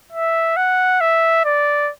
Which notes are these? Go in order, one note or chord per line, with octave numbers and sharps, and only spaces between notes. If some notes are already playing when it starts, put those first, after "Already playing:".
E5
F#5
E5
D5